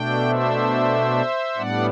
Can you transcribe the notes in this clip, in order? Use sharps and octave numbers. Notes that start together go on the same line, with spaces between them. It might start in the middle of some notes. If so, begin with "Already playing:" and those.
Already playing: B2 A3 D4 G5
C5 E5
A2 G3 B3 D4 D5 F#5